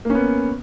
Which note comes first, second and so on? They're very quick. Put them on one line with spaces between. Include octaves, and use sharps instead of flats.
A#3 C#4 B3